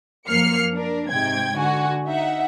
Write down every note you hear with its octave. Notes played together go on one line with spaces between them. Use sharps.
F#2 F3 A#3 F6 C7 C#7
D4 A#4
G#2 C3 G5 G#6
D3 F#4 G#5
D#4 E5 F#5